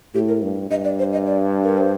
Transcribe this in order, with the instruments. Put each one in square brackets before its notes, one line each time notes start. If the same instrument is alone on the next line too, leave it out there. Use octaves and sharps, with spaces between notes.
[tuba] A2 [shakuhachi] G4
[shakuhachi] A#4
[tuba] G2
[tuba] G2 [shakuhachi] D#5
[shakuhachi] D5
C5
D#5
D5
A#4
C5